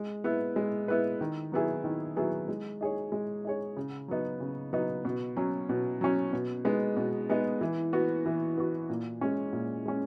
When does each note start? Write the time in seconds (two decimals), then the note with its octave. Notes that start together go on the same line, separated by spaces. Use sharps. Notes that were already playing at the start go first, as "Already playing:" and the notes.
Already playing: G#3
0.24 B3 E4 B4
0.56 G#3
0.88 B3 E4 B4
1.21 D#3
1.52 F#3 B3 E4 G#4
1.84 D#3
2.16 F#3 B3 E4 G#4
2.48 G#3
2.81 D#4 G#4 C#5
3.12 G#3
3.45 D#4 G#4 C#5
3.77 C#3
4.08 F#3 B3 D#4
4.40 C#3
4.73 F#3 B3 D#4
5.05 B2
5.37 F#3 C#4
5.69 B2
6.01 F#3 C#4
6.33 B2
6.65 G#3 B3 D#4
6.97 B2
7.30 G#3 B3 D#4
7.61 E3
7.93 B3 F#4
8.26 E3
8.58 B3 F#4
8.89 A#2
9.21 G#3 C#4
9.53 A#2
9.86 G#3 C#4